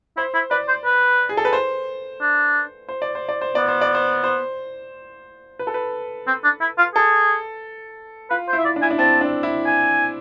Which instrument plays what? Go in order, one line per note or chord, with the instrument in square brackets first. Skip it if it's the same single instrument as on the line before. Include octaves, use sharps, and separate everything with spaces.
[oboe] E4 [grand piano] C5
[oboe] E4
[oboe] B4 [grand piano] D5
[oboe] C5
B4
[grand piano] G#4
A4
B4
C5
[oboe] D4
[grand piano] C5
D5
C5
D5
C5
[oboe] B3 [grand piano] D5
[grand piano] C5
D5
C5
C5
B4
A4
B4
[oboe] C4
D4
E4
F4
[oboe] G#4 [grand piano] A4
[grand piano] F4 [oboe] B4
[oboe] C5
[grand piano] E4
[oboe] E5
D5
[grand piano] D4
[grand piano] E4 [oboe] G#5
[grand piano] D4
[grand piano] C4 [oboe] A5
[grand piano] D4
E4
[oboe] G#5